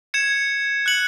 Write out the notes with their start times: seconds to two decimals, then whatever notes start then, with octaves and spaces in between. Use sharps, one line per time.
0.14 G#6 C#7 E7
0.86 F#6 C#7 F#7